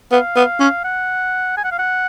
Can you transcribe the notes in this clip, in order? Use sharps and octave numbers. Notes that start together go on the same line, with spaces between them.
B3 F5
B3
C#4
F#5
G#5
F#5
F5
F#5